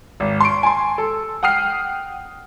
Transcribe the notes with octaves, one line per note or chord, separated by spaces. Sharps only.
G#1
C6 C#6 D7
G#5 A5 C6
A4
F#5 G5 D#6 F6 C7